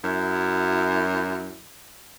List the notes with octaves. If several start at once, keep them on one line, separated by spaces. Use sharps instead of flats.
F#2 E4